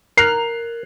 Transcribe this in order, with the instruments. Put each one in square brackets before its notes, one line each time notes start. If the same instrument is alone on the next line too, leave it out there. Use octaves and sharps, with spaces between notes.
[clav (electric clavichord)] A#4 [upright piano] F#6 C7 F7